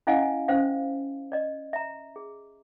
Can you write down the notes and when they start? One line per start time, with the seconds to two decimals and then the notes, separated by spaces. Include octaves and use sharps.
0.07 C#4 E4 D#5 F5 F#5 G#5
0.22 G#5
0.48 C#4 C5 F5
1.32 D5 D#5
1.73 E5 A#5
2.16 G#4